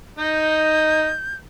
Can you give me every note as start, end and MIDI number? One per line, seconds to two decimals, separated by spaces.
0.19 1.11 63
0.19 1.11 75
0.19 1.36 91